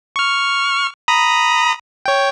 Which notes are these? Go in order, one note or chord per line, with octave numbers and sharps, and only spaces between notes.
C#6 F6
A#5 B5 D#6
C#5 G5